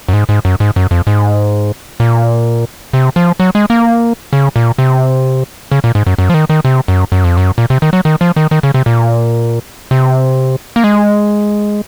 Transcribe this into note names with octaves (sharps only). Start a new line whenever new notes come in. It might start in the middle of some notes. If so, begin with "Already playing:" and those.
F#2
G#2
G#2
F#2
G#2
F#2
F2
G#2
A#2
C3
F3
F#3
G#3
A#3
C#3
A#2
C3
C#3
A#2
G#2
F#2
F#2
F3
D#3
D#3
C3
F#2
F#2
F2
F#2
A#2
C3
D#3
F#3
D#3
F3
D#3
D#3
C#3
C3
A#2
C3
A#3
G#3